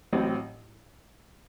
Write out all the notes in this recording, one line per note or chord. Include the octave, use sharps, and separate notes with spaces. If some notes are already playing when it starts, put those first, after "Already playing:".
A1 A2 F#3 C4